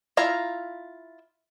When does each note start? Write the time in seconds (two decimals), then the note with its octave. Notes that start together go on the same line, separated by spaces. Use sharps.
0.17 E4 F4 A#5